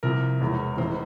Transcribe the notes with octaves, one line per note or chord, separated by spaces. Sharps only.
C2 C3 F3 A#4
E1 E2 E3
F1 E2 E3 C5